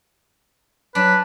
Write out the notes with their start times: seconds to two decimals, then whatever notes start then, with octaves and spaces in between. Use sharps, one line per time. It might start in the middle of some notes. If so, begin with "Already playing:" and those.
0.95 F#3 D4 B4